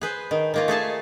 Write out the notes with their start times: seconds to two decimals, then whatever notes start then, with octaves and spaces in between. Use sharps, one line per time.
0.01 G#4 B4 C5
0.31 D#3
0.54 D#3 A#3 F4
0.68 A3 G#4 G#5 A5